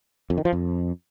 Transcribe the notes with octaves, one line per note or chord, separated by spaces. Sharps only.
F2
D#3
F3
F2